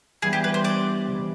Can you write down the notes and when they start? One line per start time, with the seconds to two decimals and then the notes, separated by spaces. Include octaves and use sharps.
0.22 E3 G3 B3 D4 G#4
0.33 G4
0.44 B4
0.54 C5
0.65 D5
1.06 C#2 C3 E3